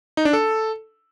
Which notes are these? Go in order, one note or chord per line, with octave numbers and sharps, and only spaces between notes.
D#4
D4
A4